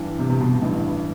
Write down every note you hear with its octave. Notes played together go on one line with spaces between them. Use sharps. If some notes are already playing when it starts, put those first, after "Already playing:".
Already playing: G2 E3 G3
C3
C3
B2
A1 G2 E3